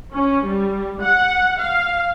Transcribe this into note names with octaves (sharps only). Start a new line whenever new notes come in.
C#4
G3
F#5
F5